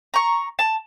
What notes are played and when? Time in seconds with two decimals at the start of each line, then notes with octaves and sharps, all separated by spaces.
0.14 A#5 C#6
0.59 A5